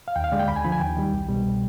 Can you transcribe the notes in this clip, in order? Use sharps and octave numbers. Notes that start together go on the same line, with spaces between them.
F5
D#2 G5
F5
D3 G#3 D5
G5
D2 B5
G#5
D3 F3 B5
G#5
D#2 G5
D#3 G3
C2
B2 G3